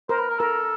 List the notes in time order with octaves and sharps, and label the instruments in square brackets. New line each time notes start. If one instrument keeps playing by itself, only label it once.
[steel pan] A#4 [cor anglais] C5
[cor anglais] B4
A#4
[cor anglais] A4 [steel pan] A#4